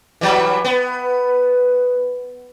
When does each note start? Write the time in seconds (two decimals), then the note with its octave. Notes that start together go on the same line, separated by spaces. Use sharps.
0.21 E3 F#3 G3
0.65 B3